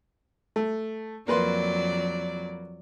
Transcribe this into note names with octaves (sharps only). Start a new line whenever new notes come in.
A3
F2 F#3 A#3 B4 D5 C6